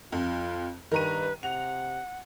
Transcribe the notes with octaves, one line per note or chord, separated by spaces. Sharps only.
F2 F4
G2 D#3 B4 A#5 D#7
C3 F#5 F7